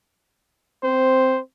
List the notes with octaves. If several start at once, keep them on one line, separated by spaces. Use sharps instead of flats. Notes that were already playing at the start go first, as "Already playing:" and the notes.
C4 C5